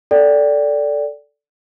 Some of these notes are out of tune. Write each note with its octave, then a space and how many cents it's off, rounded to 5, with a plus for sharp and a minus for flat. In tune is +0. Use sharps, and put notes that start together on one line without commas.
A4 +0 D5 -10 G5 +0